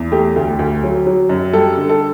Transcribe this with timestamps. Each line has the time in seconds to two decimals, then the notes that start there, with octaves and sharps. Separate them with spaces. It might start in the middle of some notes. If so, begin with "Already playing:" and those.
Already playing: E2
0.12 A3 G4
0.36 D2
0.59 D2
0.83 F#3
1.06 F#3
1.29 F#2
1.53 G3 A4
1.77 D3
1.89 A4